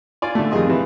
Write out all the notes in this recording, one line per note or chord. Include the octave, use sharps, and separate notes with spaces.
F4 D5 G#5
D3 A3
F2 D#3 G3 G#4 D#5 C6
C3 E3